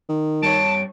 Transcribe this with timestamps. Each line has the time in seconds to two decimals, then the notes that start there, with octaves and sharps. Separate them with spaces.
0.09 D#3
0.42 G2 A4 C#5 A5 D7